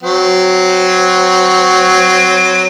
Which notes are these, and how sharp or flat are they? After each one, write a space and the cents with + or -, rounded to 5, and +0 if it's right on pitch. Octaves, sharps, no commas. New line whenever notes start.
F#3 +0 C4 -15